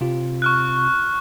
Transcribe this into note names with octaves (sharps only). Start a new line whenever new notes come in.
C3 C4 F4
C#6 F6 F#6